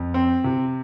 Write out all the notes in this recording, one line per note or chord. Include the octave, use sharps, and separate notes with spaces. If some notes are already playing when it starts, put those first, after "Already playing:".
Already playing: F2
C4
C3